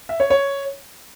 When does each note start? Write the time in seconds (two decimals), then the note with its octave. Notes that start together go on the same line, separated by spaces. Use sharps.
0.09 E5
0.20 C#5
0.30 C#5